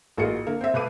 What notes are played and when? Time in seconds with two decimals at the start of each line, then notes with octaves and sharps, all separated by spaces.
0.17 A1 A#3 F4 F#4 G#4 C#7
0.47 D3 A#3
0.61 C4 E5
0.74 B2 A3 B4 F5 D6 D#7